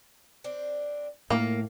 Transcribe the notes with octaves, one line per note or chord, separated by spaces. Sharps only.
C4 D4
A2 A#3 F4 A#4